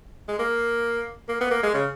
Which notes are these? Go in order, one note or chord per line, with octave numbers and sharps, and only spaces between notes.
G#3
A#3
A#3
B3
A#3
G#3
C#3